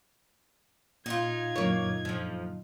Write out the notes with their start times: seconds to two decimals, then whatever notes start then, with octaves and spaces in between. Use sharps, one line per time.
1.06 A#2 D#4 F4 G#6
1.56 F#2 A#2 D3 A#3 C#5
2.05 F2 F3